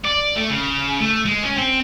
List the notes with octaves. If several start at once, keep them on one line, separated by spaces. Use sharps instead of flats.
D5
A3
C#3
A3
G#3
C#4
C4